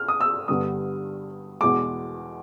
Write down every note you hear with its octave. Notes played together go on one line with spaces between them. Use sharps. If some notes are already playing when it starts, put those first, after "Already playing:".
Already playing: F6
D#6
E6
G2 D3 G3 B3 D#6
E2 B2 G#3 D6